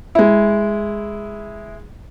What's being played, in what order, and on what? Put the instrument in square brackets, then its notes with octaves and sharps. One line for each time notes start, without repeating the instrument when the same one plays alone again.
[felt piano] G#3 E4